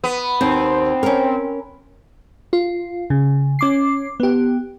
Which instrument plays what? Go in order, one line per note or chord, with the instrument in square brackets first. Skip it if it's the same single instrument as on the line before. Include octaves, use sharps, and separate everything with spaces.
[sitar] B3
[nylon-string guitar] D#2 [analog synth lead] C4
[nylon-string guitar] C#4 A#4
[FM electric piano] F4
C#3
C#4 D6 C7
B3 G4